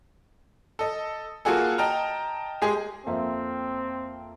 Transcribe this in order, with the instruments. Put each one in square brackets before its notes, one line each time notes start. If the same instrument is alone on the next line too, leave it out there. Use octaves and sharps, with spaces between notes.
[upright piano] A4 D#5
A#3 F4 F#4 G#4 A4
D#5 G5 A5 A#5 F6
G#3 G4 G#4
[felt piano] F2 A#3 E5 [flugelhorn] C4